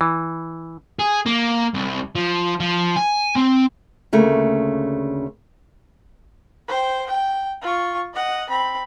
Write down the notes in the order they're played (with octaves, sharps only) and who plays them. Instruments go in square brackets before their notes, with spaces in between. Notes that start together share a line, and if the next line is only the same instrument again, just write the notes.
[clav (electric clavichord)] E3
[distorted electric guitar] G#4
A#3
C2
F3
F3
G#5
C4
[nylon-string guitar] D2 C#3 A3 A#3
[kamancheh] C5 G5
G5
F4 C#6
D#5 F#5
C4 B5